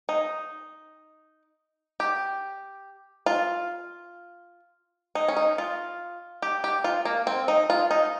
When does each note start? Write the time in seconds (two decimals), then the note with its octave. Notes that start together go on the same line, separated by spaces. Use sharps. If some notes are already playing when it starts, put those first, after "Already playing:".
0.09 D#4
2.00 G4
3.26 F4
5.15 D#4
5.28 C#4
5.37 D#4
5.58 F4
6.42 G4
6.64 G4
6.84 F4
7.05 A#3
7.27 C4
7.48 D#4
7.70 F4
7.91 D#4